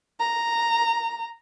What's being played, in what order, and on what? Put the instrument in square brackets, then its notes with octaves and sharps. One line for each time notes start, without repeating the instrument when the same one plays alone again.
[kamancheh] A#5